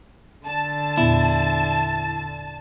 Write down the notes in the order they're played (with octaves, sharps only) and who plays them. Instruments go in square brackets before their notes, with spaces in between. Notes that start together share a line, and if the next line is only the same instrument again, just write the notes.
[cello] D3 [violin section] A5
[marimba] E2 A#2 B3 [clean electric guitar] E4